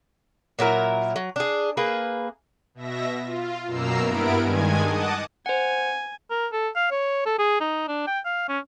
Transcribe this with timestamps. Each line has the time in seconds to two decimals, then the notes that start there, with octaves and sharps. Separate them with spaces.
0.59 A#2 F#3 E4 A#4
1.16 F#3
1.36 D4 G#4
1.77 A#3 G#4 B4
2.75 B2 E5 A#6
3.24 F4
3.67 F#2 B2 A#3 A#5 E6 C7
4.00 G2 B3 E4 A#4 D7
4.43 G2 D#3 G#3 G#5 G#6
4.84 D#5 F#5 A5 D6 D#6
5.46 C5 F#5 G#5
6.31 A#4
6.53 A4
6.75 F5
6.91 C#5
7.26 A4
7.39 G#4
7.61 D#4
7.88 D4
8.07 G5
8.25 F5
8.49 C#4